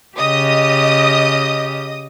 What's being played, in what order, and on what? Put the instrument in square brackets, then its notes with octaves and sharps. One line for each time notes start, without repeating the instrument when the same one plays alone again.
[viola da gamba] C#3 G4 [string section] D#5 D#6